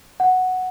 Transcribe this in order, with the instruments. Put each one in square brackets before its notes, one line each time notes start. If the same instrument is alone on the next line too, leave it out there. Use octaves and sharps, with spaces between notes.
[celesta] F#5